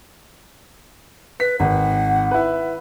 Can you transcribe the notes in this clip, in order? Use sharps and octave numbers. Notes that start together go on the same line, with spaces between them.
B4 B6
G#1 F#5
E4 B4